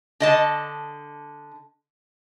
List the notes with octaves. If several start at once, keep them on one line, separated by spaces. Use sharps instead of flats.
D3 D#5 A5